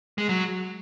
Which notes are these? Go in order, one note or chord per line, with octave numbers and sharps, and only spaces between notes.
G#3
F#3